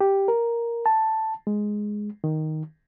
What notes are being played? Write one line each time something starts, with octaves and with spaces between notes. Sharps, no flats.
G4
A#4
A5
G#3
D#3